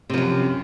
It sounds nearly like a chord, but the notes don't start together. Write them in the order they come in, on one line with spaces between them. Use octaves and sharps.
C3 F3 F#2